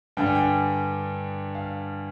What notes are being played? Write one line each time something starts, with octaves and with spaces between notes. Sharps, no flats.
G2 D3 G3 G5
G#5
G5
F5